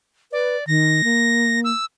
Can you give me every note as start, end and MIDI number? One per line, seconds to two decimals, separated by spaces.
0.32 0.56 71
0.32 0.67 74
0.67 1.02 51
0.67 1.60 94
1.04 1.71 58
1.64 1.85 88